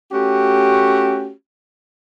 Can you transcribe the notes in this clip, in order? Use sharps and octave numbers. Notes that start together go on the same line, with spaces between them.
A3 C#4 F#4 G4